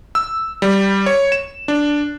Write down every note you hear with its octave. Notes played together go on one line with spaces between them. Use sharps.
E6
G3
C#5
E7
D4